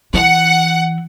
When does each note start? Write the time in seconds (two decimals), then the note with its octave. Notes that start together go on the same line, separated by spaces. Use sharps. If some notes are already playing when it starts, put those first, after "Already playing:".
0.14 E3 F#5